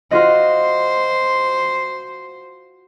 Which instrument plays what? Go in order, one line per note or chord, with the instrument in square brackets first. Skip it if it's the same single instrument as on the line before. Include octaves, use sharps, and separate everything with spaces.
[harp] F4 F#4 D#5 [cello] C5